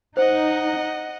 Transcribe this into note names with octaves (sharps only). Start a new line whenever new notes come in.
D#4 C5 D#5 F#5